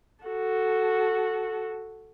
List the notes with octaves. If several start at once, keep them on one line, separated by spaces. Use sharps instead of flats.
F#4 A4